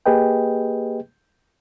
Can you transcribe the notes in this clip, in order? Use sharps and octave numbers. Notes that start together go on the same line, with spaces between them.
A#3 G4 G#4 B4 D#5 G5